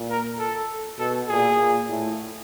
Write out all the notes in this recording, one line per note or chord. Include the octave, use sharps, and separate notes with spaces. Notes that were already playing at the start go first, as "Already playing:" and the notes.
Already playing: A#2
A#4
A4
B2 A4
A#2 G#4
A#2
A2